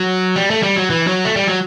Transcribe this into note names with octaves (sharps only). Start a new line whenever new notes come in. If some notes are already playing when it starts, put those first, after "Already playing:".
Already playing: F#3
G3
A3
G3
F#3
E3
F#3
A3
G3
F#3